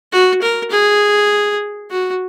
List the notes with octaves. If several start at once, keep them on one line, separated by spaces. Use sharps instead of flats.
F#4
A#4
G#4
F#4